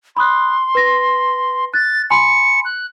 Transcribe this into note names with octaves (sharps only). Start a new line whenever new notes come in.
B5 C6 D#6 F#6
B4 A#6
F#6 A6
G#5 B5 C6 C#7
F#6